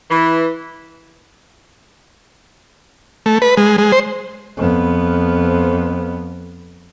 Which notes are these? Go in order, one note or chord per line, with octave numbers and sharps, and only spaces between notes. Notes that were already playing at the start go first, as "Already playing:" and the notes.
E3
A3
B4
G#3
G#3
C5
F2 B3